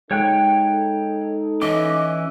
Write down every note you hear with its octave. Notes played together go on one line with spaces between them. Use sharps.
G#3 D#4 A4 C#5 G5 F#6
E3 C#4 D#5 D6